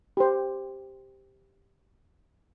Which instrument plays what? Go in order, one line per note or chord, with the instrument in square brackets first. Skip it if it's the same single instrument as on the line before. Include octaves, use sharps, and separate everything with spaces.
[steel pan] G4 C5